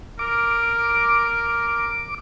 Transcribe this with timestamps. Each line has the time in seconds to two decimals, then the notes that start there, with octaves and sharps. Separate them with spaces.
0.19 A#4 D6